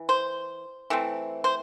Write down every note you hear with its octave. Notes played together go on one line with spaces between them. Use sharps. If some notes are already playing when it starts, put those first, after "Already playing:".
Already playing: E3
C5
E3 A3 C4
C5